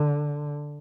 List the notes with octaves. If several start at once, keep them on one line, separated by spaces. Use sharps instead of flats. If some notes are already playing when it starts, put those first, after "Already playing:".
Already playing: D3